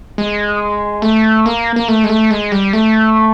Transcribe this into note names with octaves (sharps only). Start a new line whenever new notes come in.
G#3
A3
A#3
A#3
A3
G#3
A3
G#3
G3
A3